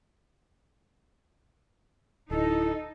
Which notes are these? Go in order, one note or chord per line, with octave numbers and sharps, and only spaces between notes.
D1 D#4 E4 A4